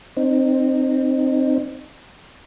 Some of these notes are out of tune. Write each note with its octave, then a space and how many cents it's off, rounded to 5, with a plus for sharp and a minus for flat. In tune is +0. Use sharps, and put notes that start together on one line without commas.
C4 +0 D#4 -30